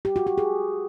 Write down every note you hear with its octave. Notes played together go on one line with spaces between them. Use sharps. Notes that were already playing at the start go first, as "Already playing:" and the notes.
G4
F#4
G4
G#4